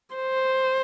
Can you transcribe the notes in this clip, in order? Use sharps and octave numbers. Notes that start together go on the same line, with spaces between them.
C5